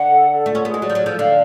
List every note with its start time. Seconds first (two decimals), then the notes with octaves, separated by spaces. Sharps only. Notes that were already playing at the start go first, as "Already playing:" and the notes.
Already playing: D3 F#5
0.10 A4
0.29 A4
0.46 A3 F4
0.55 C#4
0.65 B3 G#4
0.74 G#3
0.82 F#3 D5
0.90 F3
0.95 F#3
1.00 A4
1.06 F3
1.18 D3 F5